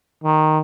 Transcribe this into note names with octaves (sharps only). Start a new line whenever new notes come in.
D#3